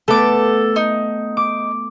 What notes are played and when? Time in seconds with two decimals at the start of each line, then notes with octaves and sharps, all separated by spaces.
0.08 A3 B3 A4 D6
0.76 D#4
1.37 D6